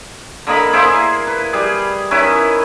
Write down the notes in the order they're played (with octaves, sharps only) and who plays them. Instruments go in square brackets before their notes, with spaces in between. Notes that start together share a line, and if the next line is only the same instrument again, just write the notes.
[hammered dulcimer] D3 A#3 D#5 B5
A#3 E4 G#4 C5
B4
G3 G#4
D#3 C#4 E4 B4